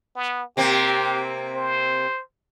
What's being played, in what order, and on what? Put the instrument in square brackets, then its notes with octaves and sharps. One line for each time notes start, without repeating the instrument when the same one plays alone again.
[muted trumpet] B3
[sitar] C3 A#3 C4 [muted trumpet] G4
[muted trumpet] C5